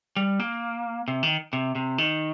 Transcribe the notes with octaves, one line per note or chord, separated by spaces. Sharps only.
G3
A#3
C3
D#3
C3
C3
D#3